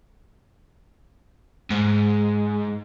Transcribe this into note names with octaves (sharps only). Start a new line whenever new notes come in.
G#2